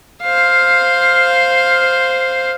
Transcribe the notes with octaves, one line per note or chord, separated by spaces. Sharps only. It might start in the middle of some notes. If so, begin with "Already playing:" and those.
C5 F5